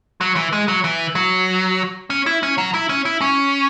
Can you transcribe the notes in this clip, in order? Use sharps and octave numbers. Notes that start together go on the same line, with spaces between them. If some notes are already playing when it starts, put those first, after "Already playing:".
F#3
E3
G#3
F#3
E3
F#3
C#4
E4
C#4
F#3
E4
C#4
E4
C#4